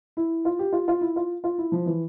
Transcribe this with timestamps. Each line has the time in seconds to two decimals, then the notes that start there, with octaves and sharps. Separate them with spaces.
0.17 E4
0.45 F4
0.59 G4
0.73 F4
0.88 F4
1.01 E4
1.16 F4
1.44 F4
1.58 E4
1.72 F3
1.86 E3